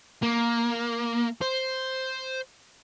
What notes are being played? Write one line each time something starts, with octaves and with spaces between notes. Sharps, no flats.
A#3
C5